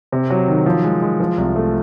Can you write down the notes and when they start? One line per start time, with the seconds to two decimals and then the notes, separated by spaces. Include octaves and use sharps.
0.12 C3
0.30 F#3
0.48 D#3
0.66 F3
0.84 G#3
1.02 G#3
1.20 F3
1.38 C2
1.56 A3